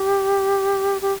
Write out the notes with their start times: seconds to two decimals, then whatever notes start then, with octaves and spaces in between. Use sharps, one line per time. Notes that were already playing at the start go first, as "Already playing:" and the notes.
Already playing: G4
1.02 G4